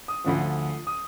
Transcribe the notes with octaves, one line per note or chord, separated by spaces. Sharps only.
D#6
D2 D3 F3
D#6